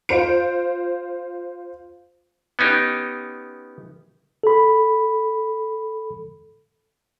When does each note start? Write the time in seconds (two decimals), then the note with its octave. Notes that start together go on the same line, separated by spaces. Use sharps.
0.09 F4 C5 D7
2.59 B3 C#4 D#4 G4
4.43 A4 B5